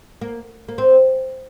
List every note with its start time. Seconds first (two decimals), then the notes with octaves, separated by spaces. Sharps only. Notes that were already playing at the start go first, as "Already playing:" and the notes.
0.21 A#3
0.68 A#3
0.78 C4